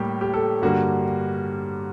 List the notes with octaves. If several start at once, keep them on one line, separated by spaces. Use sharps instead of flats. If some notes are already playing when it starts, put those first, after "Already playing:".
Already playing: A2 G3 A#3 G4
G4
A4
G2 D3 G3 A#3 F#4